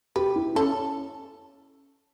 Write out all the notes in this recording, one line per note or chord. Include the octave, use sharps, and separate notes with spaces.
G4 B4
E4
C#4 A4